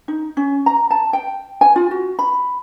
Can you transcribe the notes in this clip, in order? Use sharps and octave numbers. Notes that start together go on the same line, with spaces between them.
D#4
C#4
A#5
A5
G5
G#5
F4
F#4
B5